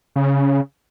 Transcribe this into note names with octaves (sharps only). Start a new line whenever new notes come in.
C#3